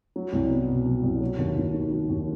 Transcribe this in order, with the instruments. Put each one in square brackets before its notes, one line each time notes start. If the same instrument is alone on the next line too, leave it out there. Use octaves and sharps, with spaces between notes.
[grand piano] F#3
C2
B3
B2
F#3
C2
F#3
D#2
D#2
D#3
F#3
D#2